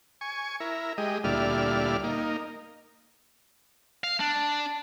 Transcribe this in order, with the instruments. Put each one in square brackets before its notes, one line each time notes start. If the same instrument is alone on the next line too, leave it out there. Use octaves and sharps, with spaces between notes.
[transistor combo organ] G#5 C#6
E4 A#4
G#3 G4 D#5
D2 A#2 G3 E4 D5 F6
A#3 D#4
[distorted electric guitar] F5
D4